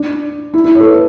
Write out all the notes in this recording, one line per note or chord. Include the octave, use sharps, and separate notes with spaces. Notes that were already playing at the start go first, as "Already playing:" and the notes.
Already playing: D4
E4
E4
C#5
A4
B4